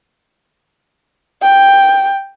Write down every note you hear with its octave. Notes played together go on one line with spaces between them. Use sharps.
G5